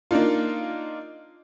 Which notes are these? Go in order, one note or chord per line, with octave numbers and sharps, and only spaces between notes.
A#3 D4 D#4 F4